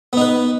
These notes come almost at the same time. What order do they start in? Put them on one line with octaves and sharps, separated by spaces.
B3 D#4 B4